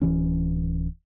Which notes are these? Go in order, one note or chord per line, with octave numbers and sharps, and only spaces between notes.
D1 D#2 E3 C#4